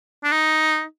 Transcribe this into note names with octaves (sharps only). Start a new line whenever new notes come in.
D4
D#4